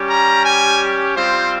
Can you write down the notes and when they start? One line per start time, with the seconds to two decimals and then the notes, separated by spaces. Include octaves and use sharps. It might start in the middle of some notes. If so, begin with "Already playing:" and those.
Already playing: G3 C#4 G4
0.09 A#5
0.45 G#5
1.16 G3 C4 F4 C5